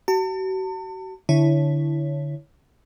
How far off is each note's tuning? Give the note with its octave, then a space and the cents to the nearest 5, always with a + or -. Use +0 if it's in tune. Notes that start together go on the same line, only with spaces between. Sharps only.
F#4 +40 A5 +40
D3 -5 E4 +0 C#5 +0